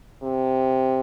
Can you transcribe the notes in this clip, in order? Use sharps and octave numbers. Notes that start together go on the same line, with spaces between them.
C3